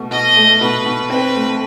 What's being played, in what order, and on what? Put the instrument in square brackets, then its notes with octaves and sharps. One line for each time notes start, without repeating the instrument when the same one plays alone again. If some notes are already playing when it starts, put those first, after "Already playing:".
Already playing: [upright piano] B2 A3
[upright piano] B2 [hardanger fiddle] D#5
[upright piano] A3
[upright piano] B2 [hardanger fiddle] B4
[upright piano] B2
[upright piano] C4 [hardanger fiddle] B4
[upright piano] A3